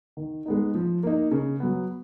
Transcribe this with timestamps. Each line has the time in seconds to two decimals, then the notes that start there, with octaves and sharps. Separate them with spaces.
0.17 D#3
0.46 G#3 B3 D#4
0.75 F3
1.03 A#3 D#4
1.31 C#3
1.60 F#3 B3